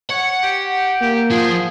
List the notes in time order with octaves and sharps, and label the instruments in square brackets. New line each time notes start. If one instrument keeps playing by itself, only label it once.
[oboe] C#5 [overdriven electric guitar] F#5
[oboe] G4
[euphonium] A#3 [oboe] G4
[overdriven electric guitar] F3 F4 [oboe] G#4